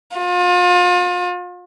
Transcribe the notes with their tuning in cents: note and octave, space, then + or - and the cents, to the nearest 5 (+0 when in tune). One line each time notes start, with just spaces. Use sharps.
F4 +35